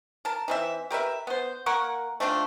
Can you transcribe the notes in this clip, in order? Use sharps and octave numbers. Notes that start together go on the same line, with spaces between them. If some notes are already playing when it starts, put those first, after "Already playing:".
A#4 A5
E3 C4 E5
G4 A#4 B4 E5
B3 C5
A#3 A#4 F#5 C#6
A3 C4 D4 F4